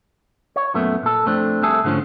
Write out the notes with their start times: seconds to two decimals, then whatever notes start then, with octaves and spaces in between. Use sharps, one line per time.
0.56 C#5
0.74 F#2 A#2 A3 B3
1.03 A#2 A4
1.26 F2 A3 C4 D4
1.62 C2 C3 A3 G#4 A4
1.84 G#2 D3 F3 A3 C#4